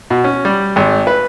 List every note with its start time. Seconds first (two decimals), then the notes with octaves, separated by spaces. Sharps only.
0.10 B2
0.24 C#4
0.45 G3
0.76 G#1
1.07 B4